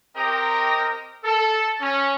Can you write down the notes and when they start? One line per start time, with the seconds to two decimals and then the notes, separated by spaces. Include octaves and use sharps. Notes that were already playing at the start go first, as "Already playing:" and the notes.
0.16 C4 G4 A#4 D#5 G5 A#5
1.24 A4
1.80 C#4